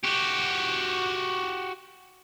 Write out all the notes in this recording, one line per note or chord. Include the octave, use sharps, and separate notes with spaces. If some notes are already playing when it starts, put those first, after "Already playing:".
F#4 G4